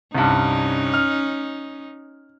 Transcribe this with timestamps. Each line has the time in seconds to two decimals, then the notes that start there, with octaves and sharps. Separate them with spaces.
0.15 C2 G2 C#4 D#4
0.94 F6